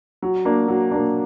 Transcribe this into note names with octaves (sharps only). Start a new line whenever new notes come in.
F#3
A#3 D4
F#3
A#3 D4